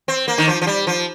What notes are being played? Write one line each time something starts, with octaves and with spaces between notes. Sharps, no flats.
C4
A#3
D#3
F3
F3
G3
F3